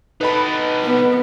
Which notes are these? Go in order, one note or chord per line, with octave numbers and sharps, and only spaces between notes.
D#4 A4 B4 D#5 B5
B3